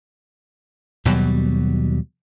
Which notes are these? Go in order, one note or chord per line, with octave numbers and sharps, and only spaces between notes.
D#2 B2 F#3 G3